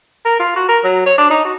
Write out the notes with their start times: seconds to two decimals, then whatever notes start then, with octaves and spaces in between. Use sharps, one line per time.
0.25 A#4
0.39 F4
0.56 F#4
0.69 A#4
0.84 F#3
1.06 C#5
1.18 D4
1.30 D#4
1.45 F#4